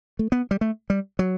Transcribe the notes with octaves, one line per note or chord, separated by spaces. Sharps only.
A3
B3
G3
A3
G3
F#3